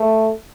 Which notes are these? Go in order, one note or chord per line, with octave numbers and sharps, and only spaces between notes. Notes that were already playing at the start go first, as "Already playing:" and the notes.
Already playing: A3